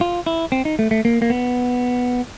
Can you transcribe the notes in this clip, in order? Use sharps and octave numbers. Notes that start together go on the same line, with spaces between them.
F4
E4
C4
D#4
A3
A3
A#3
A#3
B3